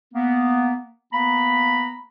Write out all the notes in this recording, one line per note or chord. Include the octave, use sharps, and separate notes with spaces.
A#3 B3
A#3 B3 A#5 B5